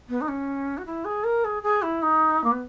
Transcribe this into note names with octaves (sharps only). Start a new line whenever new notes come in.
B3
D#4
C#4
F#4
E4
G#4
A#4
G#4
G#4
E4
D#4
A#3
B3